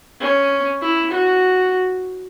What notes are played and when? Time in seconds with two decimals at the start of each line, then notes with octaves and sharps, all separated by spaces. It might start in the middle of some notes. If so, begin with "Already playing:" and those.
0.20 C#4
0.82 E4
1.11 F#4